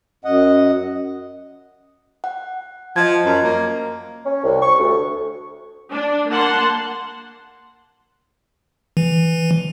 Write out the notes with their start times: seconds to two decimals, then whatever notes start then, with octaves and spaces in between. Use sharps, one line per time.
0.25 F#2 D#5 F#5
2.24 F#5
2.96 F3 D#5 G#6
3.25 F#2
3.44 A#3
4.25 C#4
4.44 C2
4.61 C#6
4.79 D2
5.92 D4
6.31 A#3 F#5 A5 C6
8.97 E3